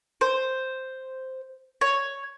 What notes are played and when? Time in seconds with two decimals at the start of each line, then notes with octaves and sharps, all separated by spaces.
0.21 C5
1.81 C#5